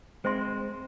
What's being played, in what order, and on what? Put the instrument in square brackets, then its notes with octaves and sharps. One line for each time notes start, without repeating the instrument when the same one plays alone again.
[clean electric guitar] G#3 C4 [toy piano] C5 E5 C6